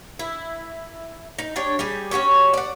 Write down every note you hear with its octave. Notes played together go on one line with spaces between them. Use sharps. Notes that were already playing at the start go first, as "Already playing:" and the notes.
E4
D#4
D4 G4 C#5
G3 G4 G#4
C#4 F#4 G4 C#5
D5 F#5